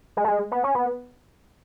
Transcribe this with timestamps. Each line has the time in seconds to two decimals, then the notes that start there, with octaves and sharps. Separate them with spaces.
0.17 G#3
0.24 A3
0.28 G#3
0.52 B3
0.64 C#4
0.75 B3